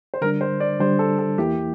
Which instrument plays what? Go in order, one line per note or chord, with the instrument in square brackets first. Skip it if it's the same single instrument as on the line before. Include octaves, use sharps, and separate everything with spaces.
[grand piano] C5
[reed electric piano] D3 G3 D4 [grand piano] A#4
[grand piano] C5
D5
[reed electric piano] D3 G3 D4 [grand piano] C5
[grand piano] A4
A4
[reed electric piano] E2 E3 A#3 E4 [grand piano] G4